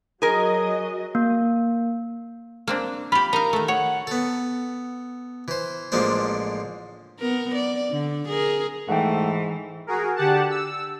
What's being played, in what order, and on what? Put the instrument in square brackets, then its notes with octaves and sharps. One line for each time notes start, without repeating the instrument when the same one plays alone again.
[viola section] F#3 D#5 [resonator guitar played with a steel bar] G#4 A#4
[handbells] A#3
[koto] A#3 C4 D4
[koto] F4 G4 [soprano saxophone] B5
[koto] D#4 F5 [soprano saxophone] A#4
[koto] D#3 A3
[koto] C#5 [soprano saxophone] F#5
[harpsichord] B3 A4
E3 C5
A1 F3 G#3 A#3 D4 C5
[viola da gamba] B3 A#4
D5
D3
G#4 A#4
[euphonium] G#2 [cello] E3 [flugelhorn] A3 [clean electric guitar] F#5 G5
[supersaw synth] F#4 G#4 A#4
D3 G4 F#5 A5
E6